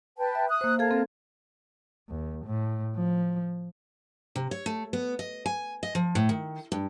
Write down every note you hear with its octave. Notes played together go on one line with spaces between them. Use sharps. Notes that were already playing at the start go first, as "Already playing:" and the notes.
B4 G5 A5
E5
D#6 F#6
A#3 C5
A4 A#4 F5 A5 G#6
C4 A4
D#2
A2
F3
C3
C#5
A3
B3
D#5
G#5
D#5
F3
A2
D#3
G2